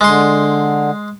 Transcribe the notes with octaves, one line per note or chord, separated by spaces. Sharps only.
D3 G#3 C6